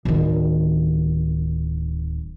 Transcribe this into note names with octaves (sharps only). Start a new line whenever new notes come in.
D1 D#3